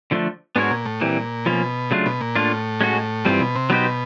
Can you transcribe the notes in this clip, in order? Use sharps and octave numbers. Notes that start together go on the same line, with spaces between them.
D3 F3 A3 D4
G#2 B3 D4 F#4 A#4 C#5
A#2
A2
A#2 E3 G3 C4
B2 F3 A#3 C#4
C#3 F#3 A3 D4 F4
B2
A#2
A2 A#3 D4 F4
G#3 C#4 F#4
G2 E3 G3 C4 F4
B2
C3
B2 F#3 B3 D#4 G4 C5